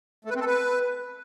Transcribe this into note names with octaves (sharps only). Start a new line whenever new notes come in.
A3
B4
C4
A4
B4